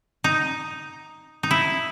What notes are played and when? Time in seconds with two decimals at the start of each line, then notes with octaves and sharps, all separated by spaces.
0.24 D#4
1.43 D#4
1.51 E4